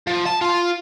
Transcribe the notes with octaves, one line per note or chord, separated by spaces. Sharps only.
F3
A5
F4